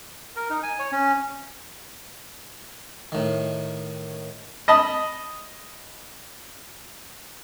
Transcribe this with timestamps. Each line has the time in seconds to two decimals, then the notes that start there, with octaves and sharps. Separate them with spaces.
0.36 A#4
0.50 D#4
0.63 G#5
0.79 C#5
0.92 C#4
3.12 A2 D#3
4.68 D#5 A5 B5